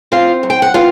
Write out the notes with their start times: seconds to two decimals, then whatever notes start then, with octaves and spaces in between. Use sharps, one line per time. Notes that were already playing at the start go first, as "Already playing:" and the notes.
0.12 C4 F4 F5
0.43 F#2
0.50 G5
0.62 F#5
0.74 B3 F4 F5